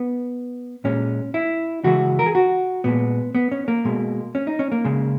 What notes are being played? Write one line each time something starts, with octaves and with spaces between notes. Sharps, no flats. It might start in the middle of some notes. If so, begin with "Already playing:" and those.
Already playing: B3
A#2 G#3 C#4
E4
C#3 E3 G#3 F#4
A#4
G#4
F#4
A#2 G#3 B3
B3
C#4
A#3
B2 G#3
C#4
D#4
C#4
A#3
C#3 G#3